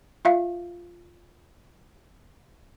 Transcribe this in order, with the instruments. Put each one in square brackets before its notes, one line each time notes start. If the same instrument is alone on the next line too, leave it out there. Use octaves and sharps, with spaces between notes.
[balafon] F4 E5 F5